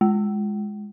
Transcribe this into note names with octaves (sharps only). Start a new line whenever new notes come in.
G#3